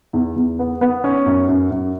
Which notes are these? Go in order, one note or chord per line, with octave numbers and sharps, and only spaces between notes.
E2
E2
B3
B3
C#4
F#2
F#2
F#2